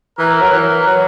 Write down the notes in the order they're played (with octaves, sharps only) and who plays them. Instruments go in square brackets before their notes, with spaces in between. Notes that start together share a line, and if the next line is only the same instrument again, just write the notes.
[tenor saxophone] E3 [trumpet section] A#4
[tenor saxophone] F#3
E3
F#3